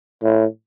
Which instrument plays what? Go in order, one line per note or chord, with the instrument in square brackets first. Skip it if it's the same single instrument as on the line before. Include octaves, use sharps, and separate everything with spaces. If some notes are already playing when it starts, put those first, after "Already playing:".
[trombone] A2